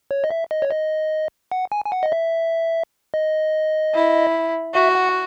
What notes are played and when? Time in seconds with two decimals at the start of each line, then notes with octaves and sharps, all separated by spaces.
0.11 C#5
0.24 D#5
0.31 E5
0.51 D#5
0.62 C#5
0.71 D#5
1.52 F#5
1.72 G#5
1.85 G#5
1.92 F#5
2.03 D#5
2.12 E5
3.14 D#5
3.95 E4
4.74 F#4 E5
4.95 F#5